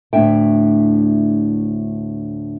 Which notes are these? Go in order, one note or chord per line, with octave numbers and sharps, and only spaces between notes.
D2 A2 D4 E5 G5